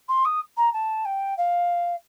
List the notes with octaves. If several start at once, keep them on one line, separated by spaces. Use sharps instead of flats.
C6
D#6
A#5
A5
G5
F5